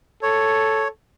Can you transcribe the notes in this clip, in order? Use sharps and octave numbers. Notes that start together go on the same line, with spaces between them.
A4 C#5